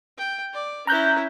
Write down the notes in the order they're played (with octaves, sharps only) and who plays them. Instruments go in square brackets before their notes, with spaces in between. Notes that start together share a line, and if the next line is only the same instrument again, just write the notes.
[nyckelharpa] G5
D5
[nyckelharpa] C#4 E4 [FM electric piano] A#5 F#6 G6